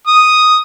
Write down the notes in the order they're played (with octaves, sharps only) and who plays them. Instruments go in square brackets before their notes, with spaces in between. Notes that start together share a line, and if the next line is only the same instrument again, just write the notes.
[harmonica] D#6